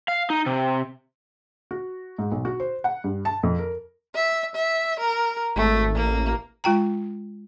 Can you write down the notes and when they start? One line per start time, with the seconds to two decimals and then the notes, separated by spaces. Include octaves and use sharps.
0.08 F5
0.30 D#4
0.46 C3
1.71 F#4
2.18 G#2
2.32 B1
2.45 F#4
2.60 C5
2.84 F#5
3.04 G2
3.25 A5
3.43 F2
3.58 A#4
4.15 E5
4.55 E5
5.00 A#4
5.56 G#1 A3
5.95 A1 A#3
6.64 G#3 F4 G5 A#5